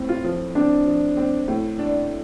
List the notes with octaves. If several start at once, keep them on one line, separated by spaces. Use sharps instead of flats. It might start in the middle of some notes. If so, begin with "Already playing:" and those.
Already playing: A2 C4
F4
F3
C4 D4
F3
C4
A2
D4